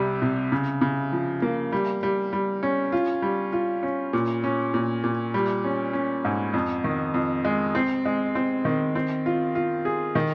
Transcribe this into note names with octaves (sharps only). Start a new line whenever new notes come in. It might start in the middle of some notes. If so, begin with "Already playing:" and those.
Already playing: C2 C3 G3
C3
C#3
C#3
F3
A#3
G3
G3
G3
C#4
F4
G3
F4
C#4
A#2
C#4
A#2
A#2
G3
C#4
C#4
G#2
F2
D#3
F2
G#3
C4
G#3
C4
D#3
C4
F4
F4
G#4
D#3